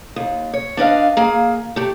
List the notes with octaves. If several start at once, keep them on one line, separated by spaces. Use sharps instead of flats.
D#2
C#5
D4 B4 D#5 F5
A#3 G#4
A3 G4